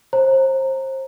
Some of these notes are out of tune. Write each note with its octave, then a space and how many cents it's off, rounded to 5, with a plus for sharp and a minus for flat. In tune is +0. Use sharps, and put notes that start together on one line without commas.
C5 +30 A#5 -10